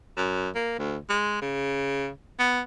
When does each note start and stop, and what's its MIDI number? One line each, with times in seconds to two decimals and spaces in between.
0.17 0.49 42
0.55 0.76 58
0.79 0.99 38
1.10 1.38 56
1.42 2.10 49
2.39 2.61 59